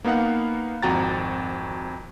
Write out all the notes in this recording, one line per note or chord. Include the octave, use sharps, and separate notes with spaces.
A#3 B3 D#4 F5 F#5
G#1 F2 F#4 G5 A#5 A6